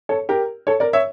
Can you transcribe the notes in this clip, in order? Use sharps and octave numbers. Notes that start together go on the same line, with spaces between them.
A4 C#5
G4 A#4
A4 C#5
A#4 D5
C#5 E5